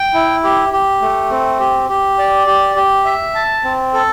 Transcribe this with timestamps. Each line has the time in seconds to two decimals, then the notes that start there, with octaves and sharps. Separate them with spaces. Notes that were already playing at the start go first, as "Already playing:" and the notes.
Already playing: G5
0.14 E4
0.44 G4
0.73 G4
1.02 A3
1.31 C4
1.60 G4
1.89 G4
2.19 D5
2.47 G4
2.76 G4
3.05 E5
3.35 A5
3.64 C4
3.93 A4